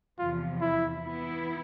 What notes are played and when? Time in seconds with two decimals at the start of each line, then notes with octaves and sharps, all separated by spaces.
0.19 E2 C3 F3 F4
0.61 E4
1.04 E3 B3 E4